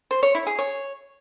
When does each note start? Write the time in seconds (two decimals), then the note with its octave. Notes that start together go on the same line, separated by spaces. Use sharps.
0.11 C5
0.23 C#5
0.35 E4
0.47 G#4
0.59 C#5